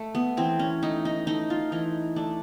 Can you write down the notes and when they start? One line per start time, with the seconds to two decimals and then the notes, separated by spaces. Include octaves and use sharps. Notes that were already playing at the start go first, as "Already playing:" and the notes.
Already playing: A3
0.15 B3
0.37 E3 C4
0.59 C#4
0.82 A3 D#4
1.05 D#4
1.27 A3 D#4
1.50 F4
1.72 E3 D#4
2.16 A3 D4